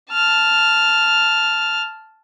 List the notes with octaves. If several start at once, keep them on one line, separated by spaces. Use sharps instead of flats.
A5 F6